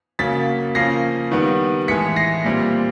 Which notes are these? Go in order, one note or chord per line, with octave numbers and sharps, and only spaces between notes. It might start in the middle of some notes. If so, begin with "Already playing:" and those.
C#3 F#3 A#3 A6 B6
C#3 F3 A#3 C#4 A#6 C7
D#3 G3 B3
A2 E3 G#3 B6 C#7
A#6 C7
A#2 G3 C4